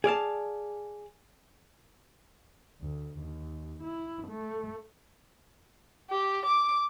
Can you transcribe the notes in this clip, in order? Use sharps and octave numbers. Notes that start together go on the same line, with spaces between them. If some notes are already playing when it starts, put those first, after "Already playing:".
G#4 D5 F5 A5
D2
D#2
E4
A3
G4
D6